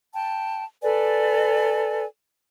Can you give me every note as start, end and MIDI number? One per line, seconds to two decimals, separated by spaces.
0.14 0.63 79
0.14 0.63 81
0.82 2.04 69
0.82 2.04 71
0.82 2.04 74
0.82 2.04 80